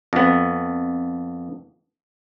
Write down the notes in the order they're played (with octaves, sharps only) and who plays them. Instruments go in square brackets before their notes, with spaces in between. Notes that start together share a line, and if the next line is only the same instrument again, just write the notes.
[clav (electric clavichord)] F2 B3